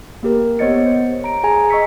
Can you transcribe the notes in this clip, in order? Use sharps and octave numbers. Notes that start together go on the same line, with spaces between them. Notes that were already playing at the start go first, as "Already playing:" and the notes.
A#3 G4 A#4
B3 C5 C#5 D#5 A6 C#7
C5
A#5 D7
G#4 G#5 A#5
D#5 C#6 E6 B6 C#7